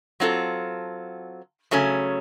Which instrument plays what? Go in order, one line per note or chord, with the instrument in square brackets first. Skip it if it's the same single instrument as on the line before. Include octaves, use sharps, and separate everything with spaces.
[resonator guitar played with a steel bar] F#3 C4 F4 A4
C#3 F#3 A3 C#4